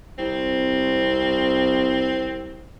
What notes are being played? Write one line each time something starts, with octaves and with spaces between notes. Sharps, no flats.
C2 C4